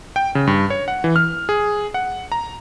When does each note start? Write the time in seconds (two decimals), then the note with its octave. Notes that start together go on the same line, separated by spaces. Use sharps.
0.16 G5
0.35 C#3
0.47 G2
0.70 C#5
0.88 F#5
1.04 E3
1.16 F6
1.49 G#4
1.94 F#5
2.32 A#5